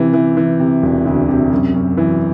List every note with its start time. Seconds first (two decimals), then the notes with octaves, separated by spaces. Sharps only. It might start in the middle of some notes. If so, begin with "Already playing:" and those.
Already playing: C3 E3
0.13 E3
0.37 E3
0.59 C3
0.82 E1
1.06 D2
1.29 C3
1.51 F#2
1.74 F#2
1.97 E3